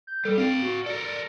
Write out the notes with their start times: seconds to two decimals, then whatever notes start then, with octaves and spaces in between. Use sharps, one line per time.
0.07 G6
0.25 G3 A4
0.38 C4 D5 F5
0.62 F#4
0.86 A4 A#4 D5